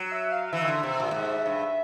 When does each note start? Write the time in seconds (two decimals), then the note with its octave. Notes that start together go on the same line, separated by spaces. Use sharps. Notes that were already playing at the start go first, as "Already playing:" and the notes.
Already playing: F#3
0.12 E5
0.32 F5
0.47 F5
0.52 E3 E5
0.61 D#3
0.68 D3
0.83 C3
1.00 A#2
1.11 A2
1.14 G#2
1.46 G2